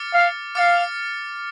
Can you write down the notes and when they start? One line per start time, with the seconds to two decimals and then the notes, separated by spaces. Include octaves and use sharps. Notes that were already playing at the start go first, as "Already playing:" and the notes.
Already playing: D6 F6 A6 C#7
0.14 F5
0.55 F5 D6 F6 A6 C#7